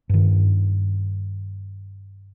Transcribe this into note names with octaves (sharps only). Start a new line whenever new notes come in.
G2 D#3